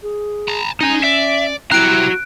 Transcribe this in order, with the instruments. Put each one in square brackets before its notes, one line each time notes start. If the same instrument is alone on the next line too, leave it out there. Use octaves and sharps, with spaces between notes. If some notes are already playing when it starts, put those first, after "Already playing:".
[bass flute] G#4
[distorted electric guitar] A5 A#5
[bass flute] C#4 [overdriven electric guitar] D#4 A#5 [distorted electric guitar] D#5 G#5
[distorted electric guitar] D5 [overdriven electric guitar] E5
[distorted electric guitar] C4 G4 [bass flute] E4 [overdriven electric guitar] F#4 A#5 [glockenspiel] F#6 D7